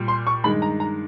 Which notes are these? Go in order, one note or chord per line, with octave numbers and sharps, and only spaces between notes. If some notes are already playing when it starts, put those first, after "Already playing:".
Already playing: A#2 G3
C6
C#6
G2 D#3 G#3 B5
A#5
A#5